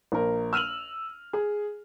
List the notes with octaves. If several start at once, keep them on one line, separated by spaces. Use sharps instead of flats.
A#1 A#4
E6 F6 D#7 F7 F#7
G#4